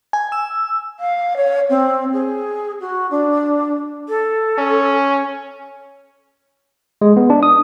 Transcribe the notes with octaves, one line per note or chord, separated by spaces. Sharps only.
G#5
E6
F5
C#5
C4
G#4
F#4
D4
A4
C#4
G#3
B3
D4
D#6